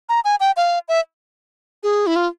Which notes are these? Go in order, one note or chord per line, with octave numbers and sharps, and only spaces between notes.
A#5
G#5
G5
F5
E5
G#4
E4
F4